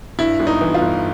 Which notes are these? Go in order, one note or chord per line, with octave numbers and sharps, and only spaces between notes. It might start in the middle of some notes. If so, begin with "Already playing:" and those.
G2 E4
G1
D#4
E3
F4
G1